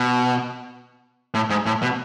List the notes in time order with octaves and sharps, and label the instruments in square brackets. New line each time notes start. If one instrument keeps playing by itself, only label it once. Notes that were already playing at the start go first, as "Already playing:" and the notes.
Already playing: [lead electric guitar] B2
A2
G#2
A2
B2